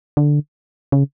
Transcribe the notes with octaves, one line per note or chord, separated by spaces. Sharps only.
D3
C#3